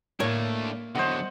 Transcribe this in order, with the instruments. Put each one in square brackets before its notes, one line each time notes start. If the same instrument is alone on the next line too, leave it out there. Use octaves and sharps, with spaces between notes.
[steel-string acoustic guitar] A2 F5 [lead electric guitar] A3 D4 [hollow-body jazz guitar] A#3 C#5
[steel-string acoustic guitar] E2 [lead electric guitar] D3 F#3 [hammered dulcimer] C5 D#5 F#5